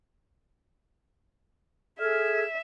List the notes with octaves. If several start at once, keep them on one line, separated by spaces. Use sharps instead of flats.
G#4 A4 E5 F6 G#6